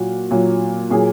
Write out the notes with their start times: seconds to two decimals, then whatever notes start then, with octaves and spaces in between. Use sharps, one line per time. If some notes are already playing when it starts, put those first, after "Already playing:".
Already playing: A#2 F#3 F#4
0.31 A#2 F#3
0.90 A#2 F#3 G#4